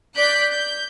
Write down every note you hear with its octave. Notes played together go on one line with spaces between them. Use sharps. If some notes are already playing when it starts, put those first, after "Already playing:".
D5 F#6 G6 B6
G6